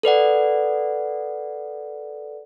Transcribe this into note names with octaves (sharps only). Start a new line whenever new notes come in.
A4 B4 D5 F#5